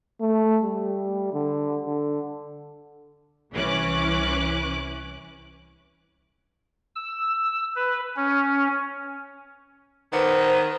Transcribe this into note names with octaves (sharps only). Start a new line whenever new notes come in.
A3
G3
D3
D3
C2 E3 C#4 D6 F#6
E6
B4
C#4
D#3 B4 C5 D5 F#5